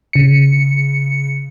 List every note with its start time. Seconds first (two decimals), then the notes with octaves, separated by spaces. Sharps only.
0.13 C#3 C#7